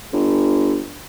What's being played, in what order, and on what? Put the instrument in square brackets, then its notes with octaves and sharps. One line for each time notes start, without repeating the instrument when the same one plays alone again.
[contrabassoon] G1